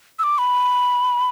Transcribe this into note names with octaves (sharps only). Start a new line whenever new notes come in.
E6
D6
B5